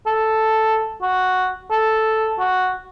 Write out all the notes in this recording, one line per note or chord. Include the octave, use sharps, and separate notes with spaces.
A4
F#4
A4
F#4